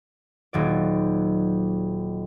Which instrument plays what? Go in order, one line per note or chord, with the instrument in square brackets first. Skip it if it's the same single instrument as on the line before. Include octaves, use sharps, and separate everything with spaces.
[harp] D#1 F#3 D5